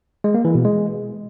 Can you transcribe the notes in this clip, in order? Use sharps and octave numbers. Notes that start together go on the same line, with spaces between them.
G#3
A#3
E3
B2
G#3